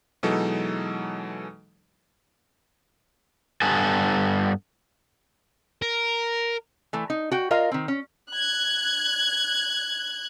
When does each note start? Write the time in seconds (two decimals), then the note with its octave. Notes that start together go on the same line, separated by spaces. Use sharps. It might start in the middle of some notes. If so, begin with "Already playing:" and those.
0.23 B2 E3 F#3 G#3 D#4 A4
3.62 G2 B3 A4 G#5
5.82 A#4
6.93 E3 A3
7.10 D#4
7.32 F#4 G5
7.51 F4 A#4 D#5 F5
7.72 D#3 C4
7.88 C#4
8.31 F#6 G#6